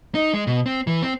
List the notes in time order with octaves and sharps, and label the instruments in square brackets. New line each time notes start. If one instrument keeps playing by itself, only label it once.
[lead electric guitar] D#4
G#3
B2
C4
E3
C4